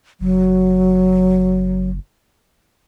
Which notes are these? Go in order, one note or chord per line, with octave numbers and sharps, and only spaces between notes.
F#1 F#3